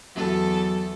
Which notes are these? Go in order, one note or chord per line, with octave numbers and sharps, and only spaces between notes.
E2 F#3 F#4 A4